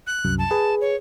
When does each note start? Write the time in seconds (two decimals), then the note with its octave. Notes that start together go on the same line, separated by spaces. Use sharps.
0.07 F#6
0.24 C2 F#2
0.38 A5
0.51 G#4 B4
0.81 C#5